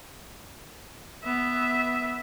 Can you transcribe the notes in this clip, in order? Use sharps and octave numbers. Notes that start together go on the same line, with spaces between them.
B3 E5